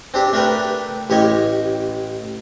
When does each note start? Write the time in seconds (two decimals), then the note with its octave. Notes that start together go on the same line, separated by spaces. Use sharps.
0.14 C4 D4 G4
0.33 A3 D4 A#4 B4 G5
1.10 A1 G4 C#5 D#5